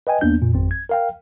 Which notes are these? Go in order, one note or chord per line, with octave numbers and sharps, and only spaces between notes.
B4 D#5 G5 G#5
D#2 A#3 B3 D4 G6
F2 A#2
G#1 F2 C4
G#6
A#4 F5 G5